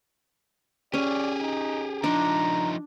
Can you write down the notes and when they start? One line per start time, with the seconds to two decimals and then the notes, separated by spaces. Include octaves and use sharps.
0.94 C#4 G4 G#4 D5
1.41 D#4
2.04 F3 D4 D#4 A#5